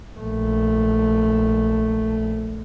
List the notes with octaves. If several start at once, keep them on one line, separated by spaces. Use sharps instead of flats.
A#1 A3